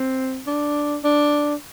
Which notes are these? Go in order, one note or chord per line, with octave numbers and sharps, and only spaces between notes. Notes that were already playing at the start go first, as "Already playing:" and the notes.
Already playing: C4
D4
D4